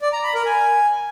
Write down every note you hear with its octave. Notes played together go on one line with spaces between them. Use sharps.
D5
A#5
B5
A#4
G#5